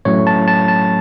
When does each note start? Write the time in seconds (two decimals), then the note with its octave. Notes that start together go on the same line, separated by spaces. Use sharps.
0.05 A2 F#3 A3 C#4 C#5
0.27 A5
0.48 A5
0.68 A5